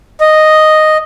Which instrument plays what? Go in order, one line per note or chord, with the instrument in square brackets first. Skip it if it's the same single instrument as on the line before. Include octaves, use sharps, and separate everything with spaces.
[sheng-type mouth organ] D#5